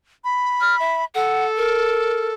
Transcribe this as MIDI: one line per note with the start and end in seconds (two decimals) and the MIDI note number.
0.24 1.05 83
0.61 0.78 89
0.80 1.03 76
1.15 2.34 69
1.15 1.45 78
1.57 2.29 70